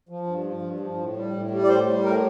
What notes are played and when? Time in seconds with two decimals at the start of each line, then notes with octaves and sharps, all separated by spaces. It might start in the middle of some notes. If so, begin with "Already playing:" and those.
0.09 F3
0.27 G2
0.44 F3
0.62 G2
0.80 F3
0.98 A2
1.16 G3
1.34 A2
1.51 G3
1.64 D5
1.69 A2 C5
1.86 G3
2.04 A2 A#4